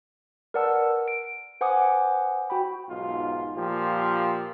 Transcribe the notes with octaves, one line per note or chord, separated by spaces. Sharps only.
A#4 B4 D5 F#5 A5 E6
D7
B4 C5 F#5 G#5 D6 D#6
F#4 G5 B5
B1 G#2 F4
A#2 F3 G4